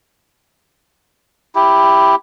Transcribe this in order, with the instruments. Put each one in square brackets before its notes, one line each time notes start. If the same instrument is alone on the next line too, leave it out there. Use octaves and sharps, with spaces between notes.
[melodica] E4 G4